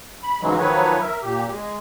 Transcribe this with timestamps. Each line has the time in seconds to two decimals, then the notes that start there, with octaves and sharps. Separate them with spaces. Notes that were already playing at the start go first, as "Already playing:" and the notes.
0.23 B5
0.41 G#2 C#3 E3 F#3 G#3
0.58 D#3 F3 F#3 B4 C#5
1.00 A#4 E5
1.22 A#2 G4
1.48 G#3